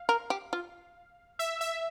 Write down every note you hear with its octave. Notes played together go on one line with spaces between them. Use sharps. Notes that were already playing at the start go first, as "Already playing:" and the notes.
Already playing: F5
A#4
G4
F4
E5
E5